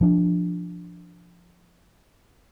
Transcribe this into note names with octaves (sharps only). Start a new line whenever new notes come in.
F3 D4